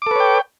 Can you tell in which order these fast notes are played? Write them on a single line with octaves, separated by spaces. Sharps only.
D6 A4 B4 C#5 G5